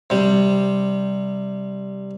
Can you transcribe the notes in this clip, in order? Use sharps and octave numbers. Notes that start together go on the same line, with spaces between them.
C3 G3